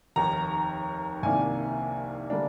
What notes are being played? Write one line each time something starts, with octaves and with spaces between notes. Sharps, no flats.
F1 D#2 D#3 A#5
C2 C3 D#3 A#3 D4 G#5
D3 G3 A#3 D4